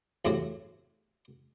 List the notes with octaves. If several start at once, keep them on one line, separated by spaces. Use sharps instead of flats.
E2 A2 C3 F#3